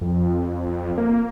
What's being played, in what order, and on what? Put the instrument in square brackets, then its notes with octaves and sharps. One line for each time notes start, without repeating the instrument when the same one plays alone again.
[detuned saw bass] F2
A#3